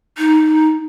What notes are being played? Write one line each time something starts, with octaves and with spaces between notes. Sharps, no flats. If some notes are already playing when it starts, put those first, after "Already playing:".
D#4